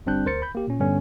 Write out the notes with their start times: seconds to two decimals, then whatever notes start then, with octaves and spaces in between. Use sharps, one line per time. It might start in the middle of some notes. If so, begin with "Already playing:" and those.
0.06 G1 G3 C4 D4 F#6 G6
0.26 D2 A#4 C5 A6 C#7
0.42 B5 G6
0.55 A#3 G4
0.67 A#2 C#4
0.80 G2 D3 G3 B3 C#4